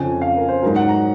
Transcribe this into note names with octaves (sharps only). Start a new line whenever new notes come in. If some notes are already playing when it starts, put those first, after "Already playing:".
Already playing: F2 C#3 F3 G#5
F5
A#4
C5
G#2 F#3 A#4
F#5
A#5